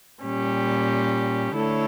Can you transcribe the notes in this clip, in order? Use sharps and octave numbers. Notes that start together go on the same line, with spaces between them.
A#2 G3 C#4 G4
D3 A3 E4 A4 C#5